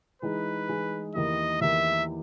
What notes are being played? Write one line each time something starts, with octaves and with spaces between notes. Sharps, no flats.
E3 G#3 D#4 G#4 B4
E3 G#3 D#4 G#4
E2 D#3 A#3 E4 G4 D#5
E2 D#3 A#3 E4 G4 E5